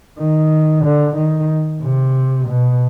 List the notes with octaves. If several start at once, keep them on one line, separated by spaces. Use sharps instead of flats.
D#3
D3
D#3
C3
B2